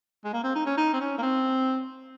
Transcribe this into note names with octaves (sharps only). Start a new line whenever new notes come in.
G#3
A#3
C4
D#4
C#4
D#4
C4
C#4
A#3
C4